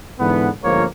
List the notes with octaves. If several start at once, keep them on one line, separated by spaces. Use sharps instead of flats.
G#2 D3 E3 B3
G1 G#2 F3 A#3 A#4 C#5